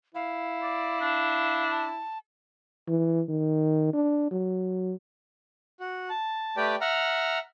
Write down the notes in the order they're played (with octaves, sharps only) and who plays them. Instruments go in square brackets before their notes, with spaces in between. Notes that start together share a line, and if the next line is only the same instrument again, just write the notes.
[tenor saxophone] E4 [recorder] F5
[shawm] D5
D4
[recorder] A5
[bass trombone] E3
D#3
D4
F#3
[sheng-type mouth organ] F#4
A5
A3 G4 B4 D5 G5
E5 F#5 A#5 F6